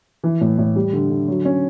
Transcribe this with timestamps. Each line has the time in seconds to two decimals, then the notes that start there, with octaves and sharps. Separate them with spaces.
0.24 E3
0.41 A2
0.58 A2
0.76 G3
0.93 D3
1.10 D3
1.28 F#3
1.45 C#4